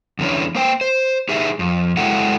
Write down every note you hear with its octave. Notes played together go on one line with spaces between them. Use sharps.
E2 D3 E3 C#4
A#3 C5 G5
C5
D#4 G4 G#4 E5
F2
F#3 G#3 E4 G4 A4 F#5